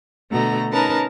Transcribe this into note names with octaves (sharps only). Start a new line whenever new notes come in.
B2 D3 A3 F#4 A#5
C#4 D#4 A#4 B4 A5 A#5